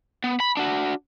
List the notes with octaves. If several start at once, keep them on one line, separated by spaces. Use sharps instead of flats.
B3
B5
D4 F#4